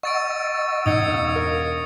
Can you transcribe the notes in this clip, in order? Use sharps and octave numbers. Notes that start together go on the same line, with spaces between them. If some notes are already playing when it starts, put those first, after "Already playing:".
D#5 F#5 C#6 E6 A6 D7
A1 D#4 D#6 G#6 C#7
E1 F5
A#4